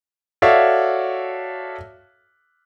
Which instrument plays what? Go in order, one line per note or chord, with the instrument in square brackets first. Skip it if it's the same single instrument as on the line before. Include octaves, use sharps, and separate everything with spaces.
[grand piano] F#4 A4 C#5 D5 E5 F5